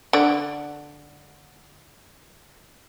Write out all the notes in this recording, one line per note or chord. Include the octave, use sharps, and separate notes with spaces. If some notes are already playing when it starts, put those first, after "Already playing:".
D3 D5